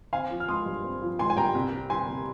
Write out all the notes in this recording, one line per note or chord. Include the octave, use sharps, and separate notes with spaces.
C4 F5 G#5
F3
F6
G#3 C6 D#6
G2
C4
F3
G#3 G#5 C6
G#5
G2 G5 A#5
C2
C3
G3 G#5 C6
C2